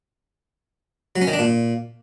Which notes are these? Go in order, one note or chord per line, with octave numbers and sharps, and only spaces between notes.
F#3
C#4
D#3
D4
A#2